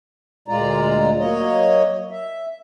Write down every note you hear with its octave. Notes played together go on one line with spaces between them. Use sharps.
D2 A#2 G#3 F4 D5 A#5
F#3 A#3 C#5 D#5
E5